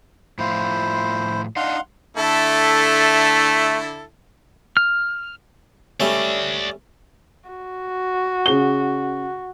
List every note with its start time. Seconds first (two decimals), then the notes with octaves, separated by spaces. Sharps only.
0.39 A2 F3 E4 F4 C5
1.56 D4 D#4 F5 F#5 C6
2.17 D3 A3 E4 A4
4.77 F6
6.00 G3 A3 C#4 D5 E5
7.49 F#4
8.46 C#3 G#4 G7